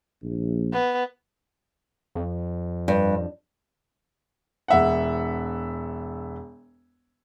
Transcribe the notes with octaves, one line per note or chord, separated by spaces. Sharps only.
A#1
B3
F2
G2
E1 E5 F#5